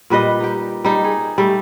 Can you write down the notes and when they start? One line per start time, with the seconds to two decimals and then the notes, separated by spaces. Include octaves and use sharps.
0.10 A#2 G3 B4 D#5
0.40 D#4 G4
0.85 G3 D#4
1.04 G#4
1.38 G3 A3